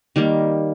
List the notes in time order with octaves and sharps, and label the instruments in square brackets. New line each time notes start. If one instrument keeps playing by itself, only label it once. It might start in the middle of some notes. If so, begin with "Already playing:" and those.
[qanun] D#3 G3 A#3